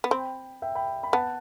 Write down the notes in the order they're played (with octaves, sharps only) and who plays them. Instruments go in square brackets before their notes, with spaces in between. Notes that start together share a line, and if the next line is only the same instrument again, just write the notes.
[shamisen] B3
[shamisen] C4 [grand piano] G5 B5
[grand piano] E5 G5
G5 B5
B5
[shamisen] B3 [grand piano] F#5 A5